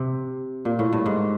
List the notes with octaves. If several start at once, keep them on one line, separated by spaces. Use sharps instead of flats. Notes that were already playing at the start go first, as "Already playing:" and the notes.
Already playing: C3
A#2
A2
G2
G#2